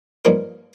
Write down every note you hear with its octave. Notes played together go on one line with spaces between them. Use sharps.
G2 F3 A#3 D#4 A#4